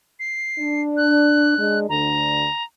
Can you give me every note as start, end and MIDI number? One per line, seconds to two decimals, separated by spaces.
0.20 0.82 96
0.60 1.57 62
0.97 1.79 90
1.58 1.86 56
1.58 1.86 62
1.89 2.47 38
1.89 2.47 50
1.89 2.63 82